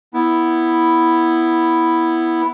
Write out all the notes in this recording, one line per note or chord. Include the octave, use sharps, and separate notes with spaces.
B3 E4